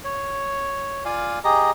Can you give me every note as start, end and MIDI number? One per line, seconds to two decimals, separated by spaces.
0.04 1.04 73
1.05 1.39 65
1.05 1.39 74
1.05 1.39 77
1.05 1.39 80
1.44 1.71 67
1.44 1.71 68
1.44 1.71 75
1.44 1.71 82